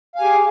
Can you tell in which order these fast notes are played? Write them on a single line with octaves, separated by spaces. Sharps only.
F5 G#5 G4 G#4